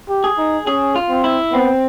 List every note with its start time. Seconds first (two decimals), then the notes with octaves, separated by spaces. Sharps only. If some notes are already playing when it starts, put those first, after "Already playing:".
0.09 G4
0.24 G#4
0.38 D#4
0.67 C#4 G#4
0.96 F4
1.09 C4
1.24 E4
1.53 B3 C4